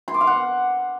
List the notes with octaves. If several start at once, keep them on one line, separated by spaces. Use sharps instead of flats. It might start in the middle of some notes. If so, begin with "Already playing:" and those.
C6
D6
F5
F#5